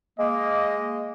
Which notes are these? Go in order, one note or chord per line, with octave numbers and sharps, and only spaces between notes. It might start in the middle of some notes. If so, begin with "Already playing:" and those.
G#3 A#3 D#5